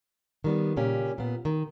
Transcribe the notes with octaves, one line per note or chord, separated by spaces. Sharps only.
D#3 G3 B3
A#2 C#3 A#3 C#4 G4
A#2 B3
D#3